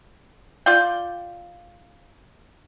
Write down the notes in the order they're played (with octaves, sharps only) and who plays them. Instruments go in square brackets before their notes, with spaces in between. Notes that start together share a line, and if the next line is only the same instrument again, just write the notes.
[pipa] F4 D5 G5